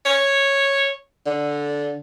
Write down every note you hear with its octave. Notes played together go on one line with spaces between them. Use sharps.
C#5
D3